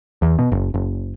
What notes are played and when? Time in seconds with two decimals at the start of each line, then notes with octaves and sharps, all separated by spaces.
0.22 E2
0.39 B2
0.52 F#1
0.74 F#1